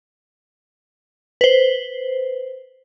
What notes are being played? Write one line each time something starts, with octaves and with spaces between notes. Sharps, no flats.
B4 C5